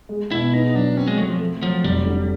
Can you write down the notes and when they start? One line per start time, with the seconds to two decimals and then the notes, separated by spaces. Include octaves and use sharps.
0.09 G#3
0.31 B2 E4
0.53 B3 D#4
0.74 F#3 D4
0.97 C4 C#4
1.07 G#3
1.18 F#3 A3
1.29 F3
1.40 A3
1.62 F3 F#3
1.84 F1 G3
2.05 D3